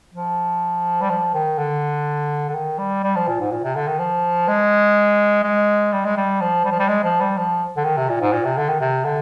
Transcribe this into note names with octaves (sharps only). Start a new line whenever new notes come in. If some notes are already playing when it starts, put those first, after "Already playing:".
F3
G3
F3
D#3
D3
D3
D#3
G3
G3
F3
A#2
G#2
A#2
C3
D3
D#3
F3
G#3
G#3
G3
G#3
G3
F3
G3
F3
G3
G#3
F3
G3
F3
D3
D#3
C3
A#2
G#2
A#2
C3
D3
D#3
C3
D3